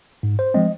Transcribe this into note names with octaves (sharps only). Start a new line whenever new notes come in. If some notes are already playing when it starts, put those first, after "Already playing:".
G#2
C5
F3 G#3 C4 D#5